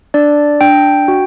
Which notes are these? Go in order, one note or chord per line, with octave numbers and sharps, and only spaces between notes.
D4 D5
D4 G5
F#4